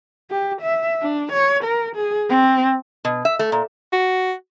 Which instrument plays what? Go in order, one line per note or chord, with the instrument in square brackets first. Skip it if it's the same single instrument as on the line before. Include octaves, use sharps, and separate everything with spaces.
[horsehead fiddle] G4
E5
D4
C#5
A#4
G#4
C4
[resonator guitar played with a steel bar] B2
E5
A3
A#2
[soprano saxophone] F#4